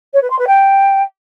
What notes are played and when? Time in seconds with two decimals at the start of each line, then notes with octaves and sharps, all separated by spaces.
0.14 C#5
0.22 B4
0.30 C6
0.39 B4
0.47 G5